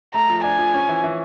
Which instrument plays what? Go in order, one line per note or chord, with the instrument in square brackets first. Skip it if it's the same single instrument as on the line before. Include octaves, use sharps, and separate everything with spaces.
[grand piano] A3 [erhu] A#5
[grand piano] F3
[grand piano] D4 [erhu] G#5
[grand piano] F3
C#4
E3
E3